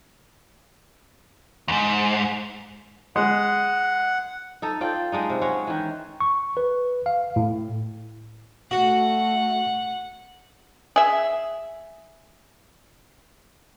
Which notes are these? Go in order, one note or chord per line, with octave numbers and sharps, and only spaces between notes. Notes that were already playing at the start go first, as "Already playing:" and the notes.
D#2 G#2
G#3 F#5
D#4 A4
F4 A4 D5 G5
G#3 D4 D#4
C3
G#3 C#4 F#5
D#3 E3
C#6
B4
F5
A2
A3 F#4 F#5
G#4 E5